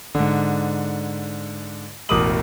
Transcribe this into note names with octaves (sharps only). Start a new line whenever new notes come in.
G#2 D3
E1 A1 A#4 D6 D#6 F#7